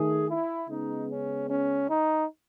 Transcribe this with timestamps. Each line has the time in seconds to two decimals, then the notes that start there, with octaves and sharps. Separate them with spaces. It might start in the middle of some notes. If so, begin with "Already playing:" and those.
Already playing: D#3 A3 G#4
0.29 E4
0.69 C#3 G#3 B3 D#4
1.09 C#4
1.49 C#4
1.88 D#4